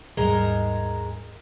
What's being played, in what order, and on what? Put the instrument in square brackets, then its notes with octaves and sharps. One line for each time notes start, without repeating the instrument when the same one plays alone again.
[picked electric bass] D#2 G#2 G3 [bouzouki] G#3 D#4 A#4